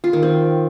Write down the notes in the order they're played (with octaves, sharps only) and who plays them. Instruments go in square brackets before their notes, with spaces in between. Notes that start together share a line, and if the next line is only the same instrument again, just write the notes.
[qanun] F4
D#3
C4